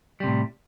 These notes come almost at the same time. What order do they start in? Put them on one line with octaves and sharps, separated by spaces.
G3 C3 A2